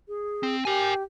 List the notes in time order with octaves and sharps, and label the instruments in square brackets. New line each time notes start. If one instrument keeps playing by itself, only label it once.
[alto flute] G#4
[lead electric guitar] C4
[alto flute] G4 [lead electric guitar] A#4 G#5